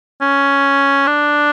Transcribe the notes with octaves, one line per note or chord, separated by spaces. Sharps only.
C#4
D4